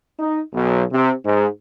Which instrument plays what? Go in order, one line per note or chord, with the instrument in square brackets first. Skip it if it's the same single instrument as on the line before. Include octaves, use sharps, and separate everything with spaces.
[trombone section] D#4
B1
C3
G#2